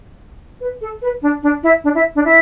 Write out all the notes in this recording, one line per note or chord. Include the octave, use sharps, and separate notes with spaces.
B4
A4
B4
D4
D4
E4
D4
E4
D4
E4